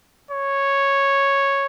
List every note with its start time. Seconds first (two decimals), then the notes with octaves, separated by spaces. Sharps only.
0.31 C#5